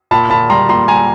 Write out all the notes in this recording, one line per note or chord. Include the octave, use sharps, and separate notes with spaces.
A#2 A5 B5
A#2 A5 B5
G3 A#5 C6
A#2 A#5 C6
G3 G#5 A#5